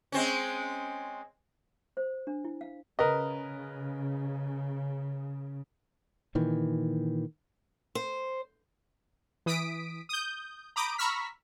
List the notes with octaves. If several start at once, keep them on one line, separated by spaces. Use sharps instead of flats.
G#3 C4 C#4
C5
D4
E4
F5
C#3 A#4 B4 D#5
A#2 D#3 E3
C5
E3 D#6 B6 D7
D#6 G6
A#5 B5 D6 D#6 G6 D7
A#5 B5 C#6 E6 F6 B6